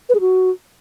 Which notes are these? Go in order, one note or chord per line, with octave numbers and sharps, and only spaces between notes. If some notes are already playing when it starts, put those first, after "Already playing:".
B4
G#4
F#4